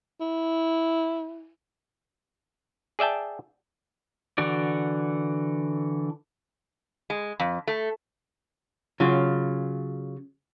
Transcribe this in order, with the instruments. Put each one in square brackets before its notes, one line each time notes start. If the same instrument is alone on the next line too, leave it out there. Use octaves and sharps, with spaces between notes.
[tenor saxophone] E4
[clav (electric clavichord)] G#4 D5 E5 G5 A5
[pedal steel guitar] D3 E3 F#4 D5
[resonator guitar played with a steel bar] G#3
F2
A3
[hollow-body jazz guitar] C#3 F#3 F4